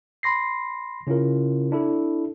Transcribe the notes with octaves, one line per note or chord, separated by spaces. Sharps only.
B5 C6 A#6 C7
C#3 C#4 E4 F4 A#4
D4 E4 A4